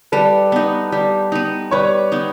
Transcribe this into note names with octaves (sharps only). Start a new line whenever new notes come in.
G3 A4 B4
B3 D#4
G3
B3 D#4
G3 B4 C#5
B3 D#4